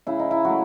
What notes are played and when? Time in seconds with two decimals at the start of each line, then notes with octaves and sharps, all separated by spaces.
0.07 C#3 E4
0.19 D#4
0.31 E4
0.45 F#3 A3 F#4